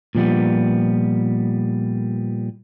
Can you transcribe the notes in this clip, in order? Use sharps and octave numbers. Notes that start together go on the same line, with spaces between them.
A#2 F3 G3 B3